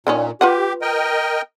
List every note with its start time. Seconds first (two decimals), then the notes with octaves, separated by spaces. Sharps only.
0.07 A#2 D3 D#3 C#4
0.41 F4 G4 B4 F#5
0.82 A#4 D#5 G5